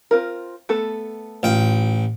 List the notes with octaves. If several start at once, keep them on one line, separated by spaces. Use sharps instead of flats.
C4 F4 A#4
A3 B3 A4
A1 F4 G5